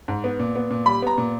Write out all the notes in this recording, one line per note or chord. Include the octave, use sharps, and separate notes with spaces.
G#2
B3
A#2
B3
A#2
G3 B5
B3 A#5
A#2